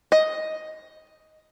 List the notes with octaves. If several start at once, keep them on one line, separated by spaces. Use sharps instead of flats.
D#5